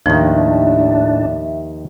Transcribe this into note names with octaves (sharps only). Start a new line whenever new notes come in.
D#2 A2 D#3 F3 D4 E5